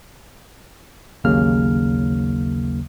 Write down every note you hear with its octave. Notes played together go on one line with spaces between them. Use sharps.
A1 D#2 C#3 F#3 A#3 F6